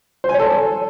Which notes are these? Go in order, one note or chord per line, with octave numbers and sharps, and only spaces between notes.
C5
G#5
C#5
A4